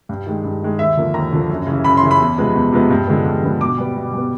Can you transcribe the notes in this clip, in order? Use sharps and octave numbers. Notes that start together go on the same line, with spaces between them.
G2
D#3 G#3
G2
D#3 G#3
D#2 E5
D3 F3 A#3
D#2 A#5
D3 F3 A#3
F#2
C#3 E3
F#2 B5
C6
C#3 E3
B5
E2
C3 F3 G#3 B3
E2
C3 F3 G#3 B3
G2
D3 F3 G#3 B3
G2
D3 F3 G#3 B3
B2 D6
G3 B3
B2
G3 B3